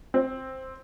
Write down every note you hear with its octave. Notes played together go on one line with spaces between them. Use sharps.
C4